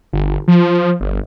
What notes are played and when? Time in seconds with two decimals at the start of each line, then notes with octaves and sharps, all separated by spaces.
0.13 G1
0.48 F3
1.00 G1